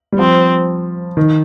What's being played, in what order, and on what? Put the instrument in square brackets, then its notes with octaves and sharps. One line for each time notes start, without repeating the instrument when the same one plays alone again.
[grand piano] G3
[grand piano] F3 [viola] C4
[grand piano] D#3